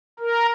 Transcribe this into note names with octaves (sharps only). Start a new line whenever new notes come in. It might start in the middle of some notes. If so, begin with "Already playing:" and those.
A#4